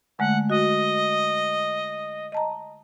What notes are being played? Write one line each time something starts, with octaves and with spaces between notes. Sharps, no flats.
D3 G#3 A3 F#5
F#4 D#5
D#5 A5 A#5